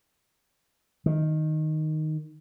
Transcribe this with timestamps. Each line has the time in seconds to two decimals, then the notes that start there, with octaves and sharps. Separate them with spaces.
1.06 D#3